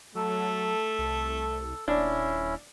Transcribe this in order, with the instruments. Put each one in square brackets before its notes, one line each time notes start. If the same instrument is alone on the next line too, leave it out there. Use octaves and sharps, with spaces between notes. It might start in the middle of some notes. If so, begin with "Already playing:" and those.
[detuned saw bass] F#3 [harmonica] A3 [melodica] A4
[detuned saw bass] C2
[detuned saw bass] D#1 [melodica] C#4 E4 [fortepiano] D4